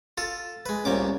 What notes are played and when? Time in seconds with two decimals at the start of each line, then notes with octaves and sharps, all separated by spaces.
0.18 F4 A4
0.66 G#3 B4
0.85 C2 A#2 C#4 D6